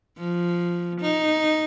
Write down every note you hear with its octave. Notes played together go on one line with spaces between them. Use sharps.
F3
D#4